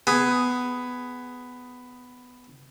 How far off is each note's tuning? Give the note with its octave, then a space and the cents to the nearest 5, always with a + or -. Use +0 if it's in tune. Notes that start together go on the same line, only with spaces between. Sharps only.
B3 +10 G#4 +0